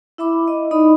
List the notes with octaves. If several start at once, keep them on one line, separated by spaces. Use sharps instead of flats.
E4 E5 B5 D6
D#5
D#4 D5 D#5 B5 D#6